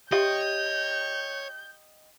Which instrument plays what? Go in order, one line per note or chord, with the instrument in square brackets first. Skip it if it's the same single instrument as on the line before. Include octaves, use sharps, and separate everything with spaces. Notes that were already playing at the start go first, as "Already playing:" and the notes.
[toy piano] G4 E5 C6 [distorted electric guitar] C#5 [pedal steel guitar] D#5 G5 [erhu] G6